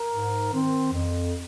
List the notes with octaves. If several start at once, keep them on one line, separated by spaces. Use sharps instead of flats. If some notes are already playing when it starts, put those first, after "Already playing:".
Already playing: A#4
G#2
D#3 C4
F2